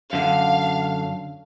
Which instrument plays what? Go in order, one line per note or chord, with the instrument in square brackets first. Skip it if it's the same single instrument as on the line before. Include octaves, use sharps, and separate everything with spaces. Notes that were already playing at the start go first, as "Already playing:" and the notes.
[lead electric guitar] F#2 D3 [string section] F5